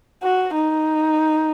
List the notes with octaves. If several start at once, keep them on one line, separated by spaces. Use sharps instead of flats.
F#4
D#4